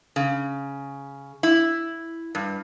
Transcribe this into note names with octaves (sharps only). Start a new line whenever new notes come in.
C#3
E4
G2